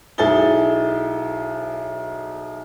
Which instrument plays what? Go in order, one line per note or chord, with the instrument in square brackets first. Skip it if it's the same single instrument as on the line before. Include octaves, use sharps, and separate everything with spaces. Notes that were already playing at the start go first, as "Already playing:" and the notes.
[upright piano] B1 E4 G#4 A4 A6 G7